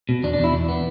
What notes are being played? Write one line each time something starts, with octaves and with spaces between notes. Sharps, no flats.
B2
E2 D4
D4
E2 E4
E2
B3